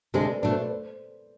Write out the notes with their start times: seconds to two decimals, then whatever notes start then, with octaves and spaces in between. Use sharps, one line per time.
0.14 D2 C3 G#3 D4 A4 C5
0.28 B4 D5
0.42 B2 A3 D4 B4 D5
0.51 A4 C5
0.61 B4 D5
0.70 C5